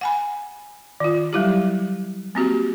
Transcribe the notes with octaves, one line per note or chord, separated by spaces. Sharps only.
F#5 G#5 B5
D#3 F4
F#3 G3 E4 G4
A#3 C4 F#4 G4